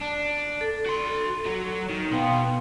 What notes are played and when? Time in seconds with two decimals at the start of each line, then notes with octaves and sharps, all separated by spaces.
0.01 D4
0.61 A4
0.86 F#4 C6
1.45 F#3 F#4
1.90 D#3
2.11 B2 B3 F5 G5 C6